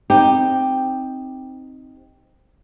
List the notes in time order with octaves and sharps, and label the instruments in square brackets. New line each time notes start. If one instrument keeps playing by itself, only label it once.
[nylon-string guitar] C4 D#4 G4